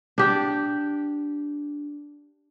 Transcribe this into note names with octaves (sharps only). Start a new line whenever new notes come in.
D4 G4